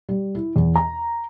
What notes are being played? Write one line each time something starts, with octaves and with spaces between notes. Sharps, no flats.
G3
E4
E2
A#5